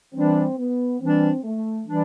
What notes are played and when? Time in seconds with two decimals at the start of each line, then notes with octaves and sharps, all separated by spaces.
0.14 E3 G3 C4 D4
0.57 B3
1.00 E3 G3 C4 D4
1.43 A3
1.86 E3 G3 D4